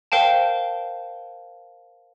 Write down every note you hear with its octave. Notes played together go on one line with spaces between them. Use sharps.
A#4 C5 F5 G5 A5